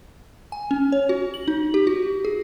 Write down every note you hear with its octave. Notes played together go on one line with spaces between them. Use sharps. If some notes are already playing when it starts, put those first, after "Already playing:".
G#5
C#4
C#5
F#4
F#7
D#4
G4
F#4
G#4